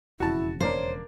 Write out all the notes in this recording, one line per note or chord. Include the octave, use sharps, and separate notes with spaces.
E1 F2 C#3 E4 F#4 A5
A#3 D4 A#4 C5 C#5